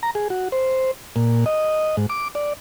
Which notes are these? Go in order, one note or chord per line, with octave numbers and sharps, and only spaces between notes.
A#5
G#4
F#4
C5
A#2
D#5
G#2
D6
D5